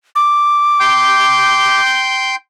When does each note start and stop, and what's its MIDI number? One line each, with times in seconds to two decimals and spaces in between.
0.15 1.80 86
0.80 2.35 79
0.80 2.35 84
0.80 2.35 91